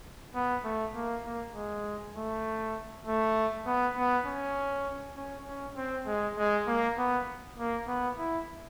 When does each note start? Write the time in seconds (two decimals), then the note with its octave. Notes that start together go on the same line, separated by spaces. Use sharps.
0.35 B3
0.64 A3
0.95 A#3
1.25 A#3
1.55 G#3
2.16 A3
3.06 A3
3.66 B3
3.97 B3
4.26 C#4
5.16 C#4
5.46 C#4
5.76 C4
6.06 G#3
6.38 G#3
6.67 A#3
6.98 B3
7.57 A#3
7.87 B3
8.18 E4